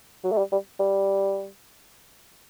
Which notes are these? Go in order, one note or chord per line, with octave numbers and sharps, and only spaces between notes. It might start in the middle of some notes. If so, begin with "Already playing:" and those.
F#3
A3
G3
G3
G3